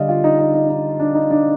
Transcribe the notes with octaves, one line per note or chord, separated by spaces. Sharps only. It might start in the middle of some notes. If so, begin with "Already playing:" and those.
Already playing: D3 G3 D5 D#5 F5
F4
D#4
D#4
D#4
D#4
D4
D#4
D4